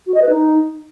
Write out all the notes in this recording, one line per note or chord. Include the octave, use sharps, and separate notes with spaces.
F#4
D#5
B4
D#4